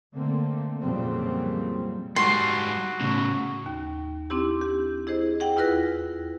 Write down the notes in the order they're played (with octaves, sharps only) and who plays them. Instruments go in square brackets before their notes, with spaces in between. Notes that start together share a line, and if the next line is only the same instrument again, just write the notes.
[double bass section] D3 A3 A#3 C4
F2 A#2 C#3 F#3 G3 C4
[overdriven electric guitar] G#2 G3 [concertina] F#4 [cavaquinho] C6
[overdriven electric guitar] A2 C#3
[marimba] D#2
C4 D4 E4 G4
G4
E4 G#4 C5 D#5
G#4 F#5 G5
E2 E4 F4 B4 F#6 A#6